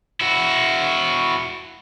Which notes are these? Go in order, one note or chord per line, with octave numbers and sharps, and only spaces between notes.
E4 F#4